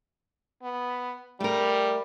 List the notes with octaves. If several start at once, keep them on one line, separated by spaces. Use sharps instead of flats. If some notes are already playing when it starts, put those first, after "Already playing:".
B3
G3 A3 A#4